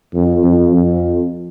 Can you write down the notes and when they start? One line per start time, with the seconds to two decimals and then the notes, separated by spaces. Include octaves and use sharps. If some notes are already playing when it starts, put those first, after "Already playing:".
0.14 F2
0.44 F2
0.73 F2